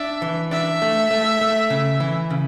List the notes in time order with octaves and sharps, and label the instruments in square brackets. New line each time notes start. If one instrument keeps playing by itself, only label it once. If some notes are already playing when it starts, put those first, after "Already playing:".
Already playing: [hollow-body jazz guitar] D4 [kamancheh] E5
[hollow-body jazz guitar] E3
[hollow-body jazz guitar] D4 [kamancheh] E5
[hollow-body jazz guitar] A3
A3
A3
C#3
E3
C#3